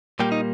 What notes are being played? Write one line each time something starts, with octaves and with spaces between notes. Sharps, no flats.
A#2 G3 A#3 G4
D#4